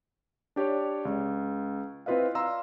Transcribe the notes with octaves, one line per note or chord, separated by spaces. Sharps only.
D4 G4 C#5 D5
C#2
C4 E4 F4 B4 D#5 F5
D5 F5 A#5 C6 E6